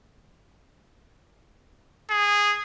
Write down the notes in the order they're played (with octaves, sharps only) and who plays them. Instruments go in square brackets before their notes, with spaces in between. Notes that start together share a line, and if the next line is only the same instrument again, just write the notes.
[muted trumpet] G#4